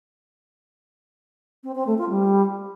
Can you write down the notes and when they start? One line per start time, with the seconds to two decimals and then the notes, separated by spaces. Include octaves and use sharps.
1.64 C4
1.75 C4
1.87 A3
1.98 F4
2.10 G3